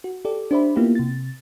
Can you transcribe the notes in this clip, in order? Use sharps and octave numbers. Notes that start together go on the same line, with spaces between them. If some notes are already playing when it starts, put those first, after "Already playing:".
F#4
G4 A4 D5
D4 G4 C5 D5 E5 B5
A#3 B3 E4 F4 G4
C3 A6